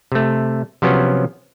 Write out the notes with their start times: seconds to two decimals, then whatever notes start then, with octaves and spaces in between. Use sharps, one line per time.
0.12 C3 A3
0.82 C3 F3 F#3 B3 C#4